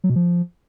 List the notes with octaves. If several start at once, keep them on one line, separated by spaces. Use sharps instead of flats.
F#3
B2
F3